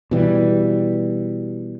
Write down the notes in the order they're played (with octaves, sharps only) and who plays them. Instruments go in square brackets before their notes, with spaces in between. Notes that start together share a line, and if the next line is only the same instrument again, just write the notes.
[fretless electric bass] B2 E3 G3